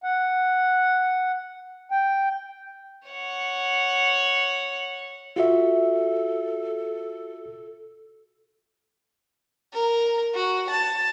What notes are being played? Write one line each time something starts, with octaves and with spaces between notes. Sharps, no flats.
F#5
G5
C#5 F#5
F4 F#4 A4 E5
A#4
F#4
A5